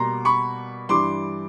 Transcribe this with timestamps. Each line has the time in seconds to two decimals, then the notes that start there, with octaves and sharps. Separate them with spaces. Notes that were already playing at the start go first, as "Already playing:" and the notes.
Already playing: B2 G3 A#3 A#5 C6
0.25 B5 C#6
0.89 G2 E3 G3 C6 D6